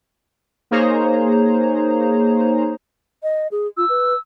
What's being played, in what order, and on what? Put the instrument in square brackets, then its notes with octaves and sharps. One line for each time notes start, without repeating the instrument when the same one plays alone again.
[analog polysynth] A#3 D#4 G#4 C5 C#5 A#5
[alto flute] D#5
G#4
[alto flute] F4 [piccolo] E6
[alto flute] B4